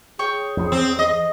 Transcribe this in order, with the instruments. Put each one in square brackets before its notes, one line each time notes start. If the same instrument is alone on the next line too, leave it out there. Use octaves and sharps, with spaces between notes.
[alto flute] G#4 [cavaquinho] C#5 G5 C#6
[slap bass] F2 F3
[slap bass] E2 [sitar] C4
[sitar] D#5